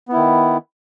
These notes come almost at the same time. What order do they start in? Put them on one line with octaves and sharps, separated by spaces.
B3 E4 D#3